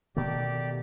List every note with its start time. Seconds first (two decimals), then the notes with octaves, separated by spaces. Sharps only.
0.17 B2 D#3 A3 G4 D5